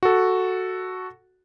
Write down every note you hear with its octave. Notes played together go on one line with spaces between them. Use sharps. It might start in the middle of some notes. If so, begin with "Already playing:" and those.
F#4 A4